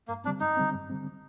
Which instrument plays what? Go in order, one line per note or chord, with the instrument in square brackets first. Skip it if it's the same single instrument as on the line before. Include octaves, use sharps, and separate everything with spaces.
[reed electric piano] G2 [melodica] A#3
[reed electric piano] D3 G3 C4 [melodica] D4
[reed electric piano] G2 [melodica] D#4
[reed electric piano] D3 G3 C4
G2
D3 G3 C4